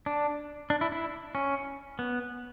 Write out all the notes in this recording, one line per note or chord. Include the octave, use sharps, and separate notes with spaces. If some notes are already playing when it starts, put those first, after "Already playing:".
D4
D4
E4
E4
C#4
B3